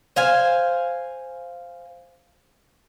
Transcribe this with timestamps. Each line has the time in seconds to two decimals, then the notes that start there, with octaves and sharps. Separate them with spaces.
0.16 C5 F5 G#5